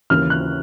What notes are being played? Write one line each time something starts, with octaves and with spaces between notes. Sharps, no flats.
D#2 C#3 E3 F6
F#6